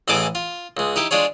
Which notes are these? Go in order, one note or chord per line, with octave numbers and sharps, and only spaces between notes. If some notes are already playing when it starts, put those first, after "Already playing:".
A1 E3 G#4 D#5 A5 D6
F4
C#2 G#3
D#4 E4 G4
G#3 D4 F4 G#4 C#5